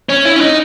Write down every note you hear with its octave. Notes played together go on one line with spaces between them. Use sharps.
C#4
E4
C#4
D#4